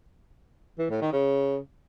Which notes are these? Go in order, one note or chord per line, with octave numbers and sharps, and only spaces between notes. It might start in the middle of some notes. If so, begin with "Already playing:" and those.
E3
A2
D#3
C#3